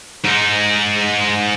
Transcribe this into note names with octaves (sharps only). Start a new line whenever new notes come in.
G#2 D#4